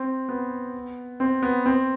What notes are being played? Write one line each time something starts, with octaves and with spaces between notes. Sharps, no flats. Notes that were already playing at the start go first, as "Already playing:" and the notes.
Already playing: C4
B3
C4
B3
C4